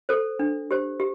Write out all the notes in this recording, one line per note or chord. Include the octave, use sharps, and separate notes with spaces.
A4 C5
D4
G4 C5
G4